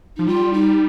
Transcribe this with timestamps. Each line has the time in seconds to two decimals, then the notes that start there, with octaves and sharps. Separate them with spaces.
0.17 F3 D#4
0.27 G3 F4
0.53 D#4